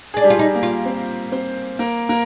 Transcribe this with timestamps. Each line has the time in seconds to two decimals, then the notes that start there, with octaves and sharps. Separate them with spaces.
0.14 D4 G#4
0.24 G3 G4
0.30 F4
0.39 D#4
0.54 A#3 A#4
0.63 F4
0.86 C4 C5
1.32 C4 C5
1.79 A#3 A#4
2.09 A#3 A#4